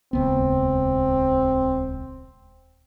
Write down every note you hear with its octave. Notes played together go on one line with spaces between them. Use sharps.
D#1 C#2 B3 C4